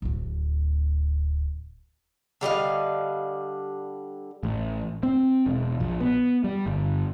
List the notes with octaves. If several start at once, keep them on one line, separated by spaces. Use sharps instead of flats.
D1 D2
D3 G3 D#5 F5
A1
C4
E1
A#1
B3
G3
G1